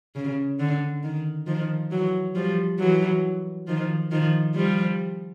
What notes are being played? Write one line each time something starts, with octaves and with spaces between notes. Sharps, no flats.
C#3
D3
D#3
D#3 F3
E3 F#3
F3 G3
E3 F#3
D#3 F3
D#3 F3
F3 G3